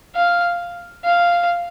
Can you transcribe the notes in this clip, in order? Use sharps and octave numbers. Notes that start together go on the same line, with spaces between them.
F5
F5